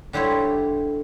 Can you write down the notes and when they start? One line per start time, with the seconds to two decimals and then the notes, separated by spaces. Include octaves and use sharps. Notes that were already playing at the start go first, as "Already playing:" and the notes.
0.13 D3 G3 E4 C5 C#5